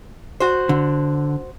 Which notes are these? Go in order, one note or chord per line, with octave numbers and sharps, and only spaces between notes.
F#4 C5
D3